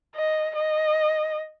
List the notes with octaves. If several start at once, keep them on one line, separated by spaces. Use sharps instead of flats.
D#5
D#5